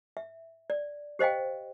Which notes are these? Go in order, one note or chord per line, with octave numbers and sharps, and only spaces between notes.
E5
D5
G4 C5 D#5 F5 G5